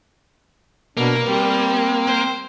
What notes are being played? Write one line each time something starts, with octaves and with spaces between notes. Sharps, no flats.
B2 A#3 D4
G3 C4
C5